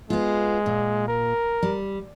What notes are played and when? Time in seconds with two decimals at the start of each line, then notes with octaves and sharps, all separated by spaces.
0.10 G#3 B3 F4
0.66 A#2
1.08 A#4
1.63 G3